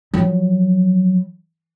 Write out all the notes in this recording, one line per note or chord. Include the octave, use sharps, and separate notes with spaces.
F3 F#3